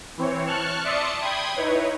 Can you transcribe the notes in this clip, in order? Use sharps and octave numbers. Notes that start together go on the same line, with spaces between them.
E3 C4 C#5
A5 C#6 F6 F#6
D5 E5 A5 C6 D#6 C#7
G5 B5 C6 D#6 G#6
D#4 E4 B4 C#5